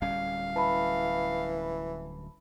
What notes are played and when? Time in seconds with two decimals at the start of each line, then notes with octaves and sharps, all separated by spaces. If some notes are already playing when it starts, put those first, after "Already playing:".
0.02 D1 G3 C#4 F5
0.56 E3 A5 B5